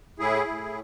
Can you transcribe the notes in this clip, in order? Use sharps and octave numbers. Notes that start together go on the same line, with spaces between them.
A2 E4 G#4
A2